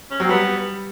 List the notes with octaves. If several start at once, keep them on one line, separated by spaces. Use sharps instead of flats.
C#4
F#3 C4
G3 B3